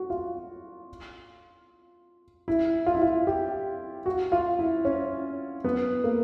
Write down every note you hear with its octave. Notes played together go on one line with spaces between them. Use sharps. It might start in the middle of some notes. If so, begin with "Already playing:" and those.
Already playing: F#4
F4
E4
F4
E4
F4
G4
F#4
F4
E4
C#4
B3
A#3